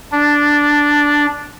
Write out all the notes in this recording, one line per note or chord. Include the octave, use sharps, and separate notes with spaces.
D4